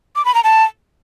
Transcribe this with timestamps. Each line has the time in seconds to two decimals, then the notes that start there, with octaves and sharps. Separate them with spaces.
0.16 D6
0.25 B5
0.35 A#5
0.44 A5